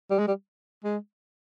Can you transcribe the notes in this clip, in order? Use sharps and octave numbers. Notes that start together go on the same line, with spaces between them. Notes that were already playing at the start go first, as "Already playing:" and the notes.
G3
G#3
G3
G#3